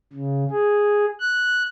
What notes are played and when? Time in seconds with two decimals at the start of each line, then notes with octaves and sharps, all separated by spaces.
0.13 C#3
0.51 G#4
1.19 F#6